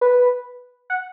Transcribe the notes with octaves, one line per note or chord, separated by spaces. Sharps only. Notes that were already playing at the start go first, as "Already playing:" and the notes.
B4
F#5